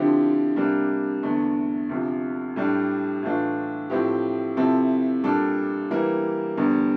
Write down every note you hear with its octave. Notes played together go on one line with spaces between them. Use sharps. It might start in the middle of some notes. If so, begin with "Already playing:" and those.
Already playing: D3 F3 C4 E4 G4
C3 G3 A#3 D4
E2 D3 A3
D2 C3 F3
A2 G3 D4
A2 E3 A3 D4 F4
A2 F3 C4 E4 G4
C3 F3 C4 E4 A4
A#2 G3 D4 A4
E3 G3 A#3 E4 A#4
E2 D3 G3